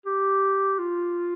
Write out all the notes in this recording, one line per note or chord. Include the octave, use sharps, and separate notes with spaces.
G4
F4